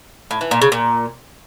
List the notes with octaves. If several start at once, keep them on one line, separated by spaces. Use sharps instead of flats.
A2
E3
A#2
C#3
A#2